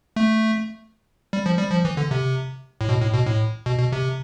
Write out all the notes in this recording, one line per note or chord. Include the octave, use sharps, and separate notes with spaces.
A3
G3
F3
G3
F3
E3
D3
C3
A2
B2
A2
B2
A2
B2
B2
C3